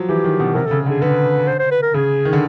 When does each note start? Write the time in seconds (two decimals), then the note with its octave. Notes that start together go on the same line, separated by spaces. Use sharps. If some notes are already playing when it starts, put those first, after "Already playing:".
Already playing: F3 F#3
0.09 E3 G4
0.24 D#3
0.40 B2
0.55 C3 A#4
0.66 C#3 A4
0.86 D3
0.90 G#4
1.02 D3 B4
1.48 C5
1.60 C5
1.71 B4
1.83 A#4
1.94 C#3 G#4
2.25 D#3
2.33 D3